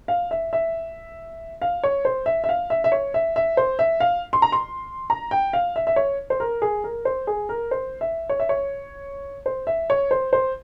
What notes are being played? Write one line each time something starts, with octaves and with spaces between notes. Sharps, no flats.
F5
E5
E5
F5
C#5
C5
E5
E5
F5
E5
E5
C#5
E5
E5
C5
E5
F5
C6
A#5
C6
A#5
G5
F5
E5
E5
C#5
C5
A#4
G#4
A#4
C5
G#4
A#4
C5
E5
C#5
E5
C#5
C5
E5
C#5
C5
C5